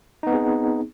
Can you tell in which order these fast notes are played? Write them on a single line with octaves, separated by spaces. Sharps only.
D#4 B3 C4 G#4